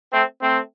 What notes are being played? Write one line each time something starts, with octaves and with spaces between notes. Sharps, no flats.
A3 C4
A3 C4